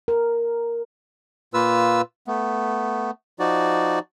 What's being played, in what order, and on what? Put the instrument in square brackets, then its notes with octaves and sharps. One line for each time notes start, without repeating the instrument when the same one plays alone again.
[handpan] A#4
[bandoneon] A#2 A#3 F4 B4 E6
A3 B3
F3 D#4 F#4 D5